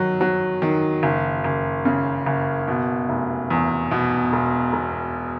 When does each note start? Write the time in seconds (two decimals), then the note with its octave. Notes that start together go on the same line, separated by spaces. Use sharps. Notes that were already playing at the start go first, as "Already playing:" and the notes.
Already playing: D#3 F#3
0.21 F#3
0.62 D#3
1.03 F#1
1.44 F#1
1.85 C#3
2.26 F#1
2.68 B2
3.09 F1
3.50 E2
3.91 B2
4.33 E1
4.73 E1